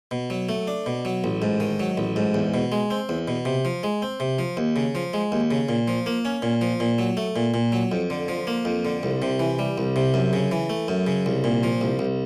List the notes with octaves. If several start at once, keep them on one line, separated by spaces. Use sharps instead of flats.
B2
F#3
A3
D4
B2
F#3
A1
G#2
D#3
F#3
A1
G#2
E2
B2
G#3
C4
E2
B2
C3
F3
G#3
C4
C3
F3
D#2
C#3
F3
G#3
D#2
C#3
A#2
F3
A#3
C#4
A#2
F3
A#2
F#3
A3
A#2
A#2
F#3
F2
D3
F3
A#3
F2
D3
C2
C3
E3
G3
C2
C3
F#2
C#3
E3
A3
F#2
C#3
C2
A#2
F3
C2
C2